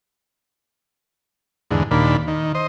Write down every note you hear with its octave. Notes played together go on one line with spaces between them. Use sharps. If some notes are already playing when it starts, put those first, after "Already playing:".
E2 G#2 D3
D#2 A#2 D4 B5
D#3
C5 D#5